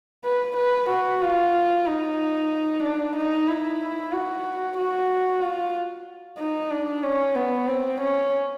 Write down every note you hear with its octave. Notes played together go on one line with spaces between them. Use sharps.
B4
B4
F#4
F4
D#4
D4
D#4
E4
F#4
F#4
F4
D#4
D4
C#4
B3
C4
C#4